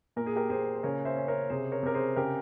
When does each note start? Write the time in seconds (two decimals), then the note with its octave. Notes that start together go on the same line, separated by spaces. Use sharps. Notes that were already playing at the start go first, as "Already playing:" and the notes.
0.16 A#2 A#4
0.26 G#4
0.36 G4 A#4
0.50 A#2 G#4 C5
0.75 C5
0.83 C#3 A#4 C#5
1.05 C5 E5
1.16 C#4
1.28 A#4 C#5
1.50 C3 G#4 C5
1.72 A#4 C#5
1.83 C3 A#4
1.94 G#4 C5
2.16 C#3 G4 A#4